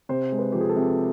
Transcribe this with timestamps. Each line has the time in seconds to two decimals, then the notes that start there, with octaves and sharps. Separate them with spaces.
0.09 C3 C5
0.32 G#3
0.38 B4
0.52 F3 G4
0.61 G#4
0.69 A4
0.77 C3